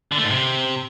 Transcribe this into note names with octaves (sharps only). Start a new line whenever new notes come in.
D3
A3
G#2
C3